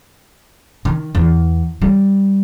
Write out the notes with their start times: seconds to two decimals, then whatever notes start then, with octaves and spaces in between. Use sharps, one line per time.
0.85 D#3
1.15 E2
1.82 G3